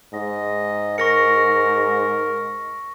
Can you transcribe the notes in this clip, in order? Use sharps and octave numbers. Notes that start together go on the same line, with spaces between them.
G#2 D#5
A#4 C#6 A#6 C#7